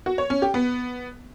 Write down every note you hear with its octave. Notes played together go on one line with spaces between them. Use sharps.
F#4
C#5
C#4
G4
B3